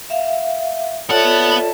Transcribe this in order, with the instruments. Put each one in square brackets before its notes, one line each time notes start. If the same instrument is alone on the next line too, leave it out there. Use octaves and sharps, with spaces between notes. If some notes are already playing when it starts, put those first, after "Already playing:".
[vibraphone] E5 F5
[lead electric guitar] B3 F#5 [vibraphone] F4 A4 D5 [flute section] C#5 E5 A5